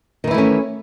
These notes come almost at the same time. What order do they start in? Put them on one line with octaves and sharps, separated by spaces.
D#3 E3 E4 A3 C#4